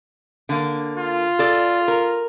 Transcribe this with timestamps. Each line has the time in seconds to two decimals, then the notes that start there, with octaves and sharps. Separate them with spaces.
0.49 D3 A#3
0.97 F4
1.39 A4 D5
1.88 A#4